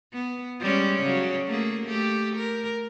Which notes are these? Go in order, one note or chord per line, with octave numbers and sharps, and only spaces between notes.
B3
G3 G#3 C#4
C#3 F#3
A3 A#3 G#4
A3 G4
A#4